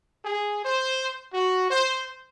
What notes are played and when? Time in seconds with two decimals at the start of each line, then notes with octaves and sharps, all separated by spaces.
0.24 G#4
0.64 C5
1.33 F#4
1.70 C5